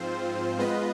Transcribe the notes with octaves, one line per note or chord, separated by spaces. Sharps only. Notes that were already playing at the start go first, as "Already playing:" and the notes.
Already playing: G#2 F3 C4 F4 C5
G#3 B3 F4 B4 D#5